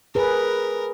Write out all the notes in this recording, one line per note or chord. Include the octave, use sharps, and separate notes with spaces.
G#4 A#4 B4